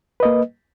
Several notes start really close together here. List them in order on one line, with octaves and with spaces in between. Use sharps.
B4 D#5 A#3